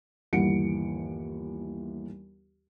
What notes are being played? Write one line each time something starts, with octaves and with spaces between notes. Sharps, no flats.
G1 D#2 E3 F#5 C#7 D7